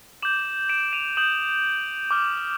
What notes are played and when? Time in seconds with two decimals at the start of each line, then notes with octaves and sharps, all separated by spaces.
0.23 D6 G6 E7 F#7
0.69 D7 E7
0.93 D#7 F7
1.17 D#6 G6 E7 F#7
2.11 D6 F6